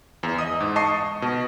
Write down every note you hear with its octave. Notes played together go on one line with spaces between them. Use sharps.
E2
D#5 D#6
G#2
D#5 A5 C#6 D#6 C7
B2